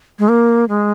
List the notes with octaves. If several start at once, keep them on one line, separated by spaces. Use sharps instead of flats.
G#3
A#3
G#3